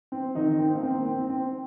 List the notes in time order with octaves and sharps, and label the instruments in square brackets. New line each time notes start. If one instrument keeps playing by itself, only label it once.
[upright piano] C4
D#3 D#4
C4
A#3
C4
C4
C4